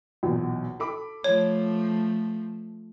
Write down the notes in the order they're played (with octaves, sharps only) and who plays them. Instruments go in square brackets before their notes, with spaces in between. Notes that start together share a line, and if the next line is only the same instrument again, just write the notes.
[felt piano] B1 E2 A#2
A4 B5 D6
[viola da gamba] F3 A3 [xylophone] C#5